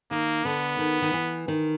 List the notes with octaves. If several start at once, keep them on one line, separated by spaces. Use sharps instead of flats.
D#3 A#3
D3 B3
D#3
D#3
E3
D#3